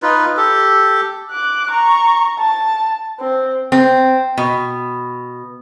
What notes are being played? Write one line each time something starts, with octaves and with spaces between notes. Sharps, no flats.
D#4 F4 B4
G4 A4
D6 F#6
A#5 C#6
A5
C4
C4
B2